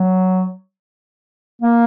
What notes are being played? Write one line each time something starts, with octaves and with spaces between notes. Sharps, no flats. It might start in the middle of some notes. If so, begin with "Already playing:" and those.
Already playing: F#3
A#3